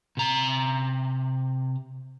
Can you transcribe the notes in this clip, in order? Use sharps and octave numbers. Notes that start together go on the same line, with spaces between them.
C3 A#5